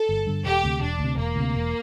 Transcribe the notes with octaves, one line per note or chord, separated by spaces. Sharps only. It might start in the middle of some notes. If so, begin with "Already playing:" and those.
Already playing: A4
G1
G2 D3
E1 G4
D2 C3
E1 D4
D2
C3
E1 A#3
D2 C3
E1